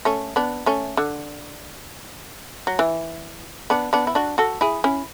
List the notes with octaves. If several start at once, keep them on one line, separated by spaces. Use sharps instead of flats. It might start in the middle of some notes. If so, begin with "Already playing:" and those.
A3 C#4
B3 D4
A3 C#4
D3
F#3
E3
B3 D4
B3 D4
E4
D4 F#4
F#4 A4
E4 G#4
C#4 E4